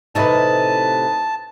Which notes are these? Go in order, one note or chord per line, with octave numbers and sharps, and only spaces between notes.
A2 C3 E3 D#4 B4 A5